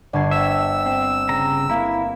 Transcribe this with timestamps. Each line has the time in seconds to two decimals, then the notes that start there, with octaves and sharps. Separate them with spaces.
0.13 G1 D5 A5 C#6 G#6 C7
0.31 C5 D5 E5 G5 E6
0.86 C4
1.29 C#3 A#5
1.70 A#3 E4 F5 A#5